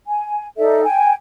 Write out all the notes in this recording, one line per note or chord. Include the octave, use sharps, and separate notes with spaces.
G#5
D#4 A4 D5 E5
G5 G#5